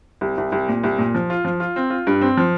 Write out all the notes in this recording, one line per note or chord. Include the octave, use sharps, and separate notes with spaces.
C2
C2
C2
A#2
C2
A#2
F3
F4
F3
F4
C4
F4
G2
C4
F3